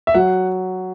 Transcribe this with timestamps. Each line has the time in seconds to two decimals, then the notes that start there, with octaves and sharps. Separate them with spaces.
0.07 E5
0.15 F#3 F#5